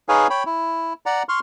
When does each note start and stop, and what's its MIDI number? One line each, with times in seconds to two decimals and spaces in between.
0.09 0.27 63
0.09 0.27 68
0.09 0.27 71
0.09 0.27 73
0.09 0.27 77
0.09 0.27 80
0.30 0.43 73
0.30 0.43 79
0.30 0.43 83
0.46 0.93 64
1.06 1.23 74
1.06 1.23 78
1.06 1.23 82
1.29 1.40 84
1.29 1.40 85
1.29 1.40 89